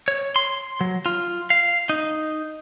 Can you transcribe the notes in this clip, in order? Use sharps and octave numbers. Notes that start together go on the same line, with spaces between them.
C#5
C6
F#3
F4
F5
D#4